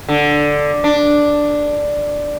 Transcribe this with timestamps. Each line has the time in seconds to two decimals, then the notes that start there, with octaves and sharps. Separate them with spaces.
0.09 D3
0.84 D4